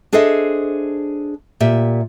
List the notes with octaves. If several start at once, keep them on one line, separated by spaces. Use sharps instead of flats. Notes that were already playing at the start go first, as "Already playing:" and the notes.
D4 G#4 A4 C5 D#5 E5
A#2 G4 E5